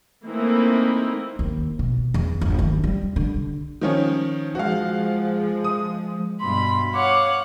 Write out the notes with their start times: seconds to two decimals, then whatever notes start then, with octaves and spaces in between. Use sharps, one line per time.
0.24 E3 A3 A#3 C4 D#4 E4
1.39 D#2
1.79 B2
2.14 E2
2.41 G1
2.59 D#2
2.84 G3
3.16 D3
3.82 D#3 F3 C#4
4.55 F3 G#3 F#4 F5
5.64 D#6
6.40 G2 B2 B5 C6
6.94 C#5 F5 F#5 D6